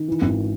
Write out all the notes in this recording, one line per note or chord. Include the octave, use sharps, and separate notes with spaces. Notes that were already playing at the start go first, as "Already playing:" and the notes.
Already playing: D#3
E3
G#1